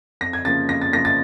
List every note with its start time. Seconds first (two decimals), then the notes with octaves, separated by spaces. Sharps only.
0.21 F2 A#6
0.33 G#6
0.45 C#3 F3 A#3 A6
0.69 F2 A#6
0.82 A6
0.93 C#3 F3 A#3 A#6
1.05 A6